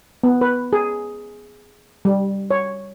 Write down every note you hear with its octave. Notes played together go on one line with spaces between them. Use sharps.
B3
B4
G#4
G3
C#5